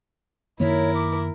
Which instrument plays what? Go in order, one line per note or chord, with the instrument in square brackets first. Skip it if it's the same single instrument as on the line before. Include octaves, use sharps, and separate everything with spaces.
[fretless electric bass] F#2 D#3 A#3 [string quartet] E4 A#4 [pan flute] C#5
[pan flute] D6